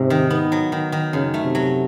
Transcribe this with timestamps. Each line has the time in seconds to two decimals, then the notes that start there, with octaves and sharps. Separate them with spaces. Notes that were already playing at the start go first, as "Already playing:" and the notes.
Already playing: G#2 C3 G#3
0.10 D#3
0.30 B3
0.52 F#3
0.72 D#3
0.92 D#3
1.13 F#2 C#3
1.34 A3
1.44 C3
1.55 F#3